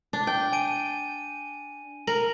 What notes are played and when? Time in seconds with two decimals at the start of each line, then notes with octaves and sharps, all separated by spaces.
0.13 D4
0.27 G5
0.53 G#5 D7 D#7
2.07 A#4 F#7